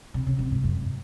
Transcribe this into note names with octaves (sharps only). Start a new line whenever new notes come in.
C3
C#3
C3
G#2
F#2